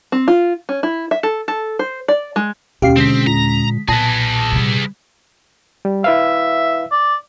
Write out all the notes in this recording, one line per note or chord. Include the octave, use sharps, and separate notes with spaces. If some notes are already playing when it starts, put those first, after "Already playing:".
C4
F4
C#4
E4
E5
A4
A4
C5
D5
G#3
D#2 B2 C#4 G4 F5 C7
D3 G#3 C4 B6
A#2 A#5
B1 A#2 G#4 B4 A5 A#6
C3 G3
G3
E4 B4 E5 F5
D5